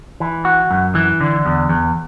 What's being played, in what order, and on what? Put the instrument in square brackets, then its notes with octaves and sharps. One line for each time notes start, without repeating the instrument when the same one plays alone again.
[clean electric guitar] E3
F#4
F#2
E3
D3
E2
E2